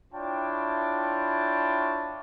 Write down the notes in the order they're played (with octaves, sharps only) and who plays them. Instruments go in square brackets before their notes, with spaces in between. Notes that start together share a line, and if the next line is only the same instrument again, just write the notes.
[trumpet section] D4 E4 F4 C#5 G5 A5